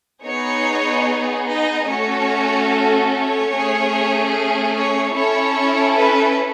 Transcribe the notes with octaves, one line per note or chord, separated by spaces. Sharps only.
B3 D#4 G#4 C#5
D#4 D#5
A3 C#4 F#4 A4 C#5
C#5
A3 C#4 G#4
C#5
C#4 E4 A4 C#5
B4